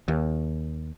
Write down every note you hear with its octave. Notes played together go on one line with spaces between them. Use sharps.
D#2